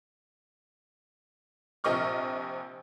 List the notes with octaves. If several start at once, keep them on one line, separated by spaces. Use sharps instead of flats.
A#1 C3 D#5 C#6 F6